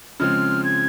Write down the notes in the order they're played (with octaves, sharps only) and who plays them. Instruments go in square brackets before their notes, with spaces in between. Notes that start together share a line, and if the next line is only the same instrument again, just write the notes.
[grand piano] C#3 F3 G#3 C4 [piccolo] F6
[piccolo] G#6